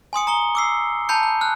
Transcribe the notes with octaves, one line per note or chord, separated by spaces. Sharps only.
G#5 C6 D#6 C#7
A#5 D#6 C#7 G7
D6 E6 C7
A5 B5 G6 C#7
G6
F6 F#6